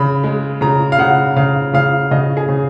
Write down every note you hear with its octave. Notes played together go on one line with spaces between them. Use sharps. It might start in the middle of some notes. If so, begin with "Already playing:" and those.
Already playing: C#3 B5
G#3
C#3 A#5
F5
C#3 F#5
C#3 F5
C#3 F5
C#3 D#5
G#4
C#3